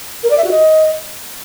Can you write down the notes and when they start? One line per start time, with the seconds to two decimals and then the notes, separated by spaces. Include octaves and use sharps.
0.23 A#4
0.30 D5
0.37 E5
0.44 F#4
0.51 D#5